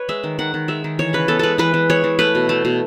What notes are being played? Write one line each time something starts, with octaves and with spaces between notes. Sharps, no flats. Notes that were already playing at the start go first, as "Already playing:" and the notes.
Already playing: B4 C#5
G#3 E5
D#3
D#3 F#5
D#3
G#3 E5
D#3
E3 C#5
C#3 B4
B3 A4
G#3 A4 B4
E3 B4
E3
G#3 C#5
E3
A3 B4
B2
A3
B2